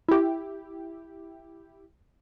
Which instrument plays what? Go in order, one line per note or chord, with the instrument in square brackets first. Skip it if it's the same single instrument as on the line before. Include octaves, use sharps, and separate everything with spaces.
[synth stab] E4 G4